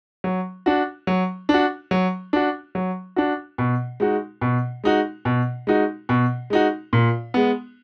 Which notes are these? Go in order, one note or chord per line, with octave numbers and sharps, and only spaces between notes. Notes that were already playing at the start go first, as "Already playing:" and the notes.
F#3
D4 F#4
F#3
D4
F#4
F#3
D4 F#4
F#3
D4 F#4
B2
G#3 D#4 F#4
B2
G#3 D#4 F#4
B2
G#3 D#4 F#4
B2
G#3 D#4 F#4
A#2
G#3 B3